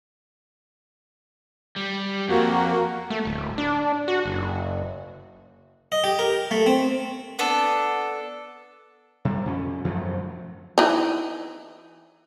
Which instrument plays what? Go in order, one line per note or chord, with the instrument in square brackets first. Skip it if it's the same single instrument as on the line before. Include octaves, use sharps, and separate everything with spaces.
[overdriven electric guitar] G3
[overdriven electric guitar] F2 [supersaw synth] A#3 F#4
[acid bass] A3
D1
D4
F#4
F#1
[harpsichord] D#5
G4
A#4
A3
C4
[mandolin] B3 D4 A4
[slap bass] C3 G3
F2 C#4
F#2 F3 F#3 A3
[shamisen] E3 D#4